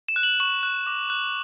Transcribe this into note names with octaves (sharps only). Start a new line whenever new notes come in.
E7
F#6
F#7
C#6 F#7
F#6
D6
F#6